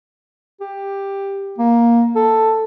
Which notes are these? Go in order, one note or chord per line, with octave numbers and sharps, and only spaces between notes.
G4
A#3
A4